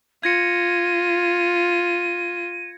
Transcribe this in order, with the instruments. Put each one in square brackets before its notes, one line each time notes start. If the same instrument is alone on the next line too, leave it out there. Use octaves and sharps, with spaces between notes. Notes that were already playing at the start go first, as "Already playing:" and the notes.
[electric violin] F4 [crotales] G#6 A#6 C#7 [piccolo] D#7